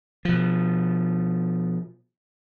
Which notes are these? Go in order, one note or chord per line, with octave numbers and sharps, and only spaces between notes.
B2 F3